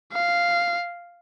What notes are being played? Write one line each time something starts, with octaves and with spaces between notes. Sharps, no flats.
F5